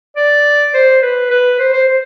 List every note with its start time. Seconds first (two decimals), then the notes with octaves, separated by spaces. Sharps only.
0.16 D5
0.74 C5
1.03 B4
1.31 B4
1.59 C5
1.73 C5
1.88 C5